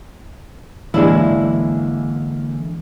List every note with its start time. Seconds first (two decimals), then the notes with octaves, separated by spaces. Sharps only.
0.94 D3 E3 G#3 A#3 D4 E4